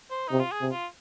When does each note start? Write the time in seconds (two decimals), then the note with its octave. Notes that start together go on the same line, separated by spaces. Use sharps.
0.11 C5
0.28 C3 D#4
0.40 F4
0.52 G#4
0.61 C3
0.72 F4